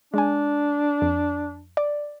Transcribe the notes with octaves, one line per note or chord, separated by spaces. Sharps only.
G#3 D4 G#5
F2
D5